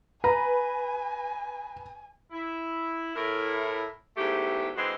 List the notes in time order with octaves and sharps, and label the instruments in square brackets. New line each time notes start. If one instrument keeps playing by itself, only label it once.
[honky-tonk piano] B4 [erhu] G#5 [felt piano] A#5
[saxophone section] E4
A2 E4 A#4
E2 G#2 A3 G4
D3 E3 G#3 C4 F#4 C5